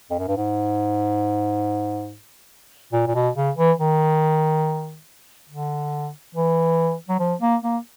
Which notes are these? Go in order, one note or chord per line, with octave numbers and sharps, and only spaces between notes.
F2
F#2
G2
G#2
A#2
A#2
B2
C#3
E3
D#3
D3
E3
F#3
F3
A#3
A#3